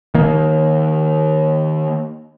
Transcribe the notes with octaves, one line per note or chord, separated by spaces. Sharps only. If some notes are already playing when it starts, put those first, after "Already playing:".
D#3 A#3